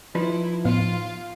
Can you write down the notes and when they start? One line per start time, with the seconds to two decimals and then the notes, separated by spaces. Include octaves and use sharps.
0.15 F3 D#4 E4 B4
0.65 A2 B3 F4 F5